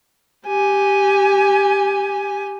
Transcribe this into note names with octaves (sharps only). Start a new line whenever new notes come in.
G4 G#5